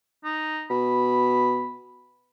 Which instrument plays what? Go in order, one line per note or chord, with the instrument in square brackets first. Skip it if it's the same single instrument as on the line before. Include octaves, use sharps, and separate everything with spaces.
[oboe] D#4
[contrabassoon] B2 [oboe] B5